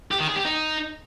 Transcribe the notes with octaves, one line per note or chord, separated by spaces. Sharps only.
G4
D#3
G#4
G4
D#4